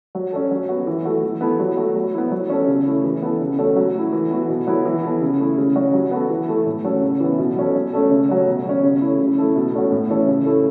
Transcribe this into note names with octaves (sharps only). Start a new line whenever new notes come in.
F#3
C#4 F#4 A4
F#3
B3 F#4
E3
A3 F#4 A4
E3
B3 E4 A4
F#3
A3 F#4
F#3
B3 E4
F#3
C#4 A4
C#3
A3 E4
E3
B3 A4
C#3
A3 C#4 F#4 A4
F#3
A3 E4
E3
B3 F#4
B2
F#3 B3 E4 A4
E3
B3 A4
C#3
A3 E4 A4
C#3
F#3 C#4 F#4
F#3
B3 F#4 A4
E3
A3 E4 A4
A2
F#3 C#4 A4
C#3
E3 B3
B2
F#3 C#4 A4
F#3
A3 C#4 A4
C#3
F#3 A3 C#4
B2
F#3 C#4
C#3
A3 E4
C#3
A3 E4 A4
B2
A3 C#4 F#4
A2
E3 C#4 A4
C#3
A3 E4 A4